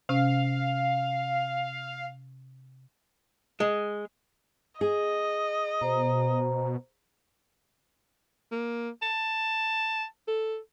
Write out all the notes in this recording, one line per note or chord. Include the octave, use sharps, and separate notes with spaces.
C3 C#4 F5
G#3
G#4 D#5
B2 C5 A#5
A#3
A5
A4